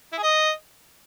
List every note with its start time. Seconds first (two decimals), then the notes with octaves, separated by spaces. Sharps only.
0.13 E4
0.18 G#4
0.23 D#5